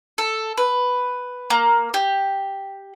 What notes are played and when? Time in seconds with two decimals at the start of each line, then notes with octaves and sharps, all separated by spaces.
0.18 A4
0.58 B4
1.50 A#3
1.94 G4